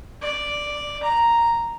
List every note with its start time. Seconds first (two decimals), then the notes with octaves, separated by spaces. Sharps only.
0.22 D5
1.03 A#5